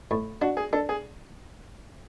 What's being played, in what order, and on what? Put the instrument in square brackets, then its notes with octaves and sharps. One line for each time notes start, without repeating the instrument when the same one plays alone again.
[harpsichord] A2
[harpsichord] D4 [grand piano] F#4
[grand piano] G#4
[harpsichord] D4 [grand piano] A4
[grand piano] G#4